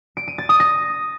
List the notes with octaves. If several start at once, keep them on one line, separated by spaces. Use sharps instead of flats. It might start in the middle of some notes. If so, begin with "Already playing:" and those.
D7
D#7
A6
D#6
A#6